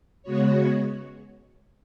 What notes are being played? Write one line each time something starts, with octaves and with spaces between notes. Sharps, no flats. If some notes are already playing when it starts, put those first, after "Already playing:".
C#3 G#3 B3 F#4 C#5